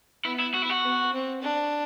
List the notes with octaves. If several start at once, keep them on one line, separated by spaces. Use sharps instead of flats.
B3 E4
E4
F#4
E4
F#4
B3
C4
D4